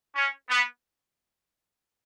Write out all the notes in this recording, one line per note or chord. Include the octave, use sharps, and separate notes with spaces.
C#4
B3